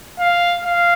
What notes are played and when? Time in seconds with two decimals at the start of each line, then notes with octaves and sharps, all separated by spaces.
0.19 F5
0.65 F5